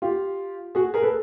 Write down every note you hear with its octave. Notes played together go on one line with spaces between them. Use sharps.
F4 G4
F#4 G#4
G#4 A#4
A4 B4